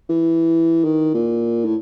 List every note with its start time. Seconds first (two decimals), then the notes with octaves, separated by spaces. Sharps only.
0.09 E3
0.84 D#3
1.14 A#2
1.65 A2